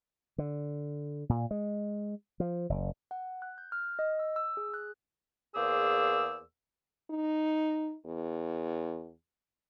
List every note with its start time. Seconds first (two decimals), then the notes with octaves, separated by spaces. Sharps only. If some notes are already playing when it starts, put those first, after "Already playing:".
0.38 D3
1.29 A#2
1.51 G#3
2.40 F3
2.69 F#1
3.11 F#5
3.42 F#6
3.58 G6
3.72 F6
3.99 D#5
4.19 E6
4.36 E6
4.57 G#4
4.74 F#6
5.56 E2 A#3 G#4 C5 D5 E6
7.10 D#4
8.06 E2